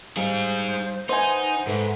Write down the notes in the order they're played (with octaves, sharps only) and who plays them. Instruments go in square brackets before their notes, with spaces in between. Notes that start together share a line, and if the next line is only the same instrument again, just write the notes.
[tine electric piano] G3 F5 [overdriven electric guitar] D#4 G#4 [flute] C5
[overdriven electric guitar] D#4 [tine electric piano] B4 E5 G6 [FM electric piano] C5 G#5 [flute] F#5
[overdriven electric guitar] G#2 [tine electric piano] A4 B4 E5